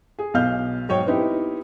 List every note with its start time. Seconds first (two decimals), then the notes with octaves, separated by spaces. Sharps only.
0.19 G#4
0.34 B1 B2 F5 F6 G6
0.89 G#2 F#3 C#5 G5
1.07 B3 C4 D#4 E4 G4